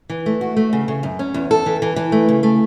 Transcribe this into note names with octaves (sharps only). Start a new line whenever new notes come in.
E3
A3
F#4
A3
C#3
C#3
F#2
C#4
E2
A4
E3
E3
E3
A3
C#3
A3